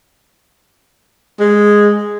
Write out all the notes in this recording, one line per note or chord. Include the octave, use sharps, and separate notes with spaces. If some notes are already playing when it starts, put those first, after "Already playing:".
G#3